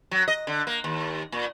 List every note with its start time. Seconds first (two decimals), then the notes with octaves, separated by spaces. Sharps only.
0.11 F#3
0.28 D#5
0.47 D3
0.67 A#3
0.84 D#2
1.32 A#2